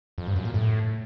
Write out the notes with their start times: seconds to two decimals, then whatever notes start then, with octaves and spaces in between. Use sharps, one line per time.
0.18 F2
0.27 G2
0.36 F#2
0.45 A#2
0.54 A2